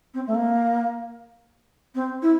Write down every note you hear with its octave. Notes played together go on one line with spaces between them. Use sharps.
C4
A3
A#3
C4
E4